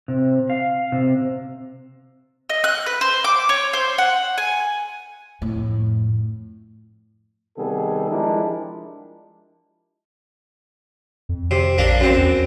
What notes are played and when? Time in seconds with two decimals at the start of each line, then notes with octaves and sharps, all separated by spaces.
0.08 C3
0.50 F5
0.92 C3
2.50 D#5
2.64 F#6
2.86 B4
3.01 C5
3.24 D6
3.49 C#5
3.73 C5
3.98 F#5
4.38 G#5
5.42 F2 A2
7.57 C3 D#3 G3 B3 G#4 A4
8.09 F3 G#3 D4 E4 G4 A#4
11.29 F2
11.51 C3
11.78 A#1 A#3 D4
12.00 F#2 C4
12.17 E2